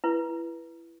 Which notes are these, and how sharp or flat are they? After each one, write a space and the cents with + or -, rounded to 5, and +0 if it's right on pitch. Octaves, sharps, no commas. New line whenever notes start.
E4 +20 B4 -15